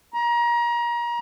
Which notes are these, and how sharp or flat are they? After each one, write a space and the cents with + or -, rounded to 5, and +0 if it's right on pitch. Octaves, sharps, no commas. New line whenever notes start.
A#5 +30